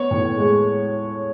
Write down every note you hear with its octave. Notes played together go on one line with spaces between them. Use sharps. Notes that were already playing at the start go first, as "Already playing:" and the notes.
Already playing: B3 C#5
A2
G#3